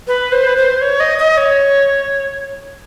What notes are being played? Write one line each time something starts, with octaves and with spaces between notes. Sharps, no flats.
B4
C5
B4
C5
C#5
D#5
D#5
C#5